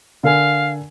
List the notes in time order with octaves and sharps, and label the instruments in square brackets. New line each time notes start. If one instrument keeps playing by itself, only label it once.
[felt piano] D3 A#4 G#5 [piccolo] F5